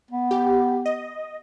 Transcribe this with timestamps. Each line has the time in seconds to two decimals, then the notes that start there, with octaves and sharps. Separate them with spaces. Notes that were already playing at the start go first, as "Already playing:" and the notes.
0.11 B3
0.31 G4
0.86 D#5